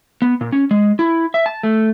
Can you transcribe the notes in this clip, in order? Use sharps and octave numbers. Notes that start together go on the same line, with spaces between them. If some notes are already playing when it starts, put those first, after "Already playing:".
B3
A#2
C#4
G#3
E4
E5
A5
A3